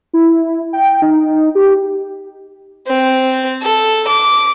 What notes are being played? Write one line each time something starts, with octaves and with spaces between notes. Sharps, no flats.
E4
G5
D#4
G4
C4
A4
D6